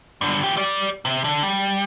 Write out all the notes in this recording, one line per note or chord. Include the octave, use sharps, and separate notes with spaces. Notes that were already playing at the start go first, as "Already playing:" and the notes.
G2 D3
E3 G4
G3 D5
C3
D3
G3